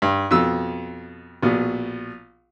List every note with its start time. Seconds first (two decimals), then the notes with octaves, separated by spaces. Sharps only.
0.02 G2
0.31 F2 B2 E6
1.43 A#1 B2